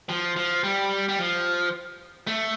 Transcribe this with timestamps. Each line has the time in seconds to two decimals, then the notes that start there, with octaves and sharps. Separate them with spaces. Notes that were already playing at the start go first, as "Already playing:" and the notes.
0.09 F3
0.36 F3
0.64 G3
1.09 G3
1.19 F3
2.27 A3